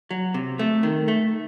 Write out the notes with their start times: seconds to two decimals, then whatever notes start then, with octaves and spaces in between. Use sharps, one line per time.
0.11 F#3
0.34 C3
0.59 A3
0.83 D#3
1.08 A3